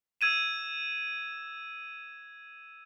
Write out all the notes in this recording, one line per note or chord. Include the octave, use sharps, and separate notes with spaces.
E6 G#6 D#7 E7